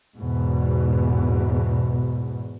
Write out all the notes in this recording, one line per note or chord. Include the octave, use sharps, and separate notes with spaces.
E2 G#2 B2